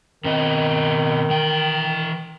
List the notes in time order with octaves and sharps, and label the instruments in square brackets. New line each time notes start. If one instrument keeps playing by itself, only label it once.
[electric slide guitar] B2 C4 D#5 [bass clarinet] D#3
[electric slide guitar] E3 G5